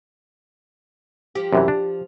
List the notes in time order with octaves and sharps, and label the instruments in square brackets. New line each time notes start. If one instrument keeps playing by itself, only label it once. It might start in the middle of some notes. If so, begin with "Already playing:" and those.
[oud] F3 G4
[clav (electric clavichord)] F#2 C3 E3
D4